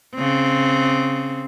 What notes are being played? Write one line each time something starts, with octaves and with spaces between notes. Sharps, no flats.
C#3 C4